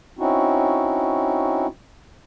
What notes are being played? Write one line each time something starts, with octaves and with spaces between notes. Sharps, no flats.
C4 C#4 D#4 E4 F#4